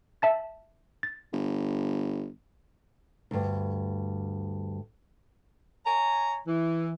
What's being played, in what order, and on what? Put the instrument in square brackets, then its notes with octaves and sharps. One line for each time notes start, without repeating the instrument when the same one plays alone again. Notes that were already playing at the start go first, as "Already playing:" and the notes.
[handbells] E5 A5 A6
A6
[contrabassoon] G1
[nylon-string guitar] D2 G2
[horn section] C#5 G#5 A#5
E3